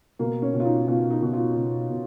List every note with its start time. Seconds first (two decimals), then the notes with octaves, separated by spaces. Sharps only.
0.19 B2 A#3
0.42 C#4
0.54 B2
0.60 F4
0.65 D#4
0.88 B2 F4
1.11 D#4
1.22 B2
1.33 F4
1.56 B2
1.90 B2